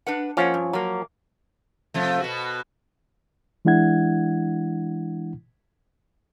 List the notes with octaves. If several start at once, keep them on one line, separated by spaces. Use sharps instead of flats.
D4 B4 F#5
F3 A#3 C#4 C#5 F#5
G2
F3 F#3 A#3
C3 F3 A3
B2 B3 F#4
E3 G#3 D4 E4 F#5 G#6